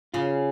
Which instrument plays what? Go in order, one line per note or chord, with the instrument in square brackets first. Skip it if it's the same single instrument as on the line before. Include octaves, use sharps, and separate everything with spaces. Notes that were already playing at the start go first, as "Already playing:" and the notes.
[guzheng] C#3 [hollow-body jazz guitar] F4